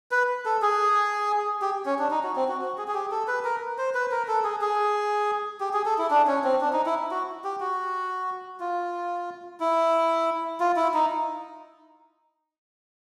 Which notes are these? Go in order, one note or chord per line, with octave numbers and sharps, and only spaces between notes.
B4
A4
G#4
G4
C#4
D4
D#4
F#4
C4
F#4
F#4
G#4
G#4
G4
A4
B4
A#4
C5
B4
A#4
A4
G#4
G#4
G4
G#4
A4
E4
D4
C#4
C4
D4
D#4
E4
F#4
G4
F#4
F4
E4
F4
E4
D#4